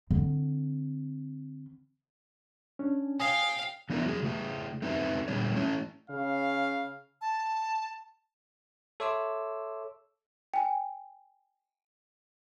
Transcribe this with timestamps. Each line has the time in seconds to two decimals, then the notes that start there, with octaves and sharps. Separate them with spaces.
0.11 D3 C4
2.79 C#4 D4
3.20 F5 G5 G#5 D#6
3.90 E3 B3 D4 E4 A#4
4.06 F#3 G#4
4.23 C#3 A3 G#4
4.82 A3 C4 D#4 B4 E5
5.28 A#2 D3 G3 G#4 C#5
5.55 A3 C#4 E4 A4
6.10 C#3 F5
7.21 A5
9.00 A4 C#5 E5 C6 D6 E6
10.54 G5 G#5